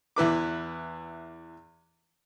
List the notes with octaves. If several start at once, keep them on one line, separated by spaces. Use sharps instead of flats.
E2 E4 B4 D6